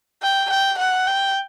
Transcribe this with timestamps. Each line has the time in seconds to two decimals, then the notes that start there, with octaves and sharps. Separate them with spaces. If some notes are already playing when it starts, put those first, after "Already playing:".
0.23 G5
0.50 G5
0.79 F#5
1.07 G5